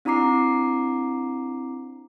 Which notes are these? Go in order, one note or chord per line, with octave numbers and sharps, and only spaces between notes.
C4 D4 E4 A#5 D6 C7